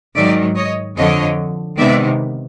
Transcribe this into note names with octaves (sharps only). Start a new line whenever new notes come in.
G#2 D#3 F#3 D5 E5
C#5 D#5
F2 D3 F3 C#5 D#5
C3 D#3 G#3 B3 D5 E5